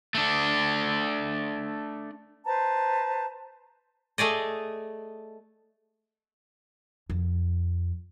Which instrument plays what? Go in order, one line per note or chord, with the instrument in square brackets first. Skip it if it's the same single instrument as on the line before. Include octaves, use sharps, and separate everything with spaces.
[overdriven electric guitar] A3 D4
[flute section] B4 C5 A5 A#5
[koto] A3 G#4 D5 D#5
[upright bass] F2